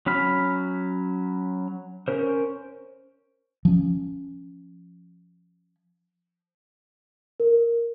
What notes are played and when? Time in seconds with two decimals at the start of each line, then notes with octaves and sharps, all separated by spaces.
0.06 F#3 C#4 B5 F6
2.08 C#4 A#4 C5
3.65 F3 C#4
7.40 A#4